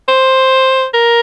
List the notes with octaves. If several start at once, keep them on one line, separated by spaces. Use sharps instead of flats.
C5
A#4